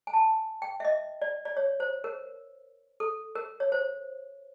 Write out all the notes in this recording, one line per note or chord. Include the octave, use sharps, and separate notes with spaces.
G#5
A5
G5
E5
D#5
D5
D5
C#5
C5
A#4
A4
A#4
C#5
C5